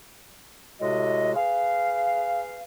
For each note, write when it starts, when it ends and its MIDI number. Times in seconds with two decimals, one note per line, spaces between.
0.81 1.33 45
0.81 1.33 48
0.81 1.33 56
0.81 1.33 66
0.81 1.33 75
1.36 2.63 68
1.36 2.63 71
1.36 2.63 77